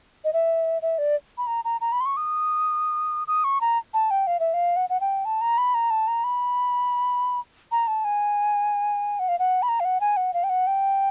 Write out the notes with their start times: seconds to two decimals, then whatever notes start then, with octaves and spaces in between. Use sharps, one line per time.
0.24 D#5
0.33 E5
0.82 E5
0.98 D5
1.38 B5
1.47 A#5
1.65 A#5
1.81 A#5
1.92 B5
2.01 C6
2.06 C#6
2.17 D#6
3.28 D#6
3.44 C#6
3.61 A#5
3.94 A5
4.11 G5
4.27 F5
4.40 E5
4.54 F5
4.76 F#5
4.90 F#5
5.01 G5
5.25 A5
5.41 A#5
5.58 B5
5.74 A#5
5.91 A5
6.08 A#5
6.24 B5
7.72 A#5
7.87 A5
8.05 G#5
9.19 F#5
9.29 F5
9.39 F#5
9.63 B5
9.69 A#5
9.80 F5
9.85 F#5
10.01 G#5
10.17 F#5
10.34 F5
10.44 G5
10.50 F#5
10.67 G5